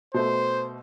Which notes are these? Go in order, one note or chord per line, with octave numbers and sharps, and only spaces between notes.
B2 A3 C5